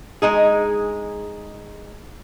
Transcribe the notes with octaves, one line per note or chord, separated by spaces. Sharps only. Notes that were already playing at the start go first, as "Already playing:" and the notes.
G#3 D#4 G#4